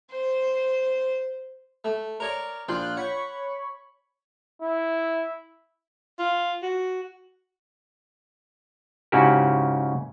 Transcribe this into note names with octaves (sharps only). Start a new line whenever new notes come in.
C5
A3
A#4 C#5 D5
A#1 F4 G5 C6 F#6 G6
C#5 F#5 B5 C#6
E4
F4
F#4
G#2 C#3 C#4 E4 F#4 G4